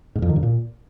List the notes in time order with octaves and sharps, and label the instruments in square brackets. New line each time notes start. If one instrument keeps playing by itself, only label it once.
[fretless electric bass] G#2
F2
D#3
G2
A#2